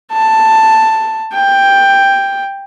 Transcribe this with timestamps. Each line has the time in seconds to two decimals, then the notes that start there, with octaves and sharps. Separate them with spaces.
0.12 A5
1.34 G5